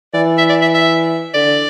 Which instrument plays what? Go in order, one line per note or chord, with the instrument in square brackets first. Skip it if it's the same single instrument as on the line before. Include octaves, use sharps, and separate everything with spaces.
[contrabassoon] E3 [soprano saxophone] D5
[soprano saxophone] E5
D5
E5
E5
[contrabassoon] D3 [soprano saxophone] D5